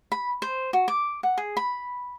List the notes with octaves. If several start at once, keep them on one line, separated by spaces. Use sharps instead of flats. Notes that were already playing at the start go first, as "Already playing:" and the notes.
B5
C5
F#4
D6
F#5
G#4
B5